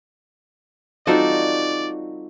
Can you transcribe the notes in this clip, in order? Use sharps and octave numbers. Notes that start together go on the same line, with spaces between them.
G3 C4 D#4 F4 F#4 A4 D5